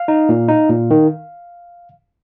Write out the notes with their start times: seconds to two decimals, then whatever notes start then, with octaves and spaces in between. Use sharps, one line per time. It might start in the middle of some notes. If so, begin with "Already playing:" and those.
Already playing: F5
0.08 D#4
0.29 A#2
0.49 D#4
0.70 A#2
0.91 D#3